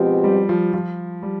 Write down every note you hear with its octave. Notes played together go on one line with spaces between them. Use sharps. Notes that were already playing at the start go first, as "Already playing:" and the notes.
Already playing: B2 F3 G#3 C4 G4
G3
F3
F3
G3